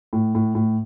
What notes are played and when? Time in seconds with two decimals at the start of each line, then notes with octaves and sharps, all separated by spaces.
0.13 A2
0.35 A2
0.55 A2